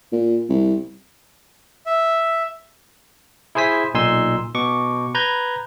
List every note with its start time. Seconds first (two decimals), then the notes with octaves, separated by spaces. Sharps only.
0.12 A#2
0.49 C2
1.86 E5
3.55 E4 G#4 C5 G#5 B6
3.94 B1 A#2 D#4 G#5 C6 E6
4.55 B2 C#6 D6
5.15 B4 A#5 G6 G#6